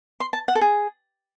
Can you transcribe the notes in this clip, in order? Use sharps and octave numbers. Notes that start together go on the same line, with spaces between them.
C6
A5
F#5
A4
G#4